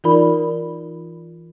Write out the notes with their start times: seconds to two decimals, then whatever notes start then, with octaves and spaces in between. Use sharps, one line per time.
0.04 E3 D#4 F4 A#4 D5 B5